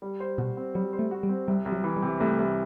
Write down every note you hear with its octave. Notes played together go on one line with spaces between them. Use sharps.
G3
C5
B2 F#4
C4
F#3 G3
C5
A3
F#4
G3
C4
C2 G3
C2
F#3
E3
G3
C3
C2 A3
C2